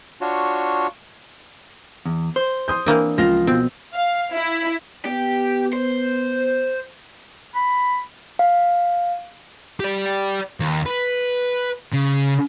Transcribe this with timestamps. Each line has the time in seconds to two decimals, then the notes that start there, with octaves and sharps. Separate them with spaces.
0.21 D4 F4 F#4 C#5
2.06 E2
2.36 C5
2.68 C6 D#6 G6
2.86 E3 A#3 C4 D4
3.18 C#2 F3 F4 A#6
3.47 B2 C4
3.93 F5
4.34 E4
5.05 B3 G4
5.73 C5
7.55 B5
8.39 F5
9.80 G4 D5
10.60 D#2
10.86 B4
11.93 C#3